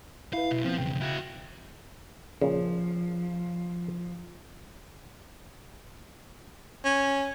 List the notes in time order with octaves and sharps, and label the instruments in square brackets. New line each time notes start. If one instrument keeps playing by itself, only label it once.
[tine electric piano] E4 B4 [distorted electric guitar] F5
[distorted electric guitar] B1
[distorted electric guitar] F3 [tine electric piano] B3 C4
[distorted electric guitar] B1 E2 [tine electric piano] C#3 G5
[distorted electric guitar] E4 F#4
[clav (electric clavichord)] A#2 C#3 [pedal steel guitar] F3
[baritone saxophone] C#4